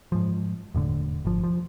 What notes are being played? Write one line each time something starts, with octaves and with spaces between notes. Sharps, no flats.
G#2 F3
E1 A2 D3
G#1 F3
F3